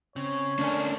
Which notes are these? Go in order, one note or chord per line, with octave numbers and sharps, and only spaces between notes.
C#3 C4 C#5
D3 A3 A#3 C#4 D4 D5 G#5